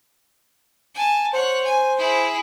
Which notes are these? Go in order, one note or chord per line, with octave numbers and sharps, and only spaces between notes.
G#5 A5
C5 C#5 F#5
G#5
E4 G#4